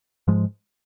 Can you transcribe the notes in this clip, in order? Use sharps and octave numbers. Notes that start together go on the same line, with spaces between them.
G#2 F3 G#3